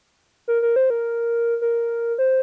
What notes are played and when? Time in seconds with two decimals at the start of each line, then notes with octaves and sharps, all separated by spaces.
0.48 A#4
0.62 A#4
0.76 C5
0.90 A#4
1.61 A#4
2.18 C5